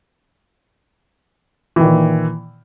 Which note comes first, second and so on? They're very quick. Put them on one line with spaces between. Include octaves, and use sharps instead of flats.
E3 D#3 A#2